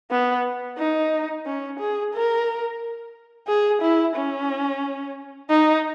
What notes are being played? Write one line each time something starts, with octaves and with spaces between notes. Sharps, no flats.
B3
D#4
C#4
G#4
A#4
G#4
E4
C#4
D#4